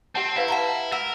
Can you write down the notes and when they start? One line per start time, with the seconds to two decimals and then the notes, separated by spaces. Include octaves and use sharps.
0.15 C4 G4 F#5 A5
0.36 E4 B4 F5 B5
0.48 F#5 A5 A#5
0.92 A#4 F#5 E6